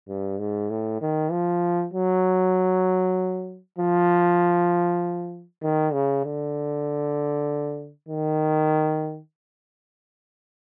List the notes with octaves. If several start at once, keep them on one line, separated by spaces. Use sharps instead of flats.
G2
G#2
A2
D#3
F3
F#3
F3
D#3
C#3
D3
D#3